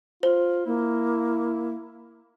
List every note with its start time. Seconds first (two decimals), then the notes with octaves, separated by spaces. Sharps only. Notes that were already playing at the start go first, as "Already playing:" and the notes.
0.23 F4 C5
0.66 A#3 E4